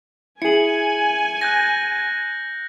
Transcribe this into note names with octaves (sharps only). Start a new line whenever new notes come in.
E4 G#4 G#5 C#7 F#7
F#6 G6 A#6